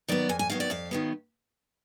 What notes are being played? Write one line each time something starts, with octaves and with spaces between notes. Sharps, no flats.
D#3 F#3 B3 D5
F2 G#5
G#5
D#3 F#3 B3 F5
D5
F2 F5
D#3 F#3 B3